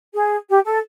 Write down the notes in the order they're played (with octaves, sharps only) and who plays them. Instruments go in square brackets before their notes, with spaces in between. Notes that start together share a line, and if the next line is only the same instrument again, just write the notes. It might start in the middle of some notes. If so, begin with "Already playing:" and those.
[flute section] G#4
G4
A4